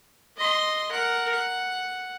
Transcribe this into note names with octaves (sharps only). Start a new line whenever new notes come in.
D#5 C6
A#4 F#5
F#5